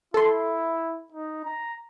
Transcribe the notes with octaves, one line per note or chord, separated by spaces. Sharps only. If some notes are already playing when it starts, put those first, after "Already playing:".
E4 A4 C6
D#4
A#5